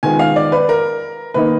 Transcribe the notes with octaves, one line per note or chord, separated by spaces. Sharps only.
D#3 G#3 B3 F4 G#5
F5
D5
B4
A#4
D#3 A#3 D#4 B4